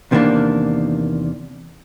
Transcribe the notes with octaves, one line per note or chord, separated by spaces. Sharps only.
E2 C3 D#3 E3 A#3 D4